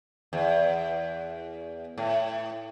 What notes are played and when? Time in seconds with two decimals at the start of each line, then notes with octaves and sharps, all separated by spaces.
0.33 E2
1.98 A2